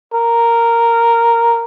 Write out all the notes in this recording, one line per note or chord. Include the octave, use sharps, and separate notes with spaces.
A#4